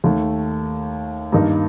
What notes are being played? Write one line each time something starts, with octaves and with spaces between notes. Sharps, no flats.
D#2 D#3 A3
G2 D#3 A#3 D#4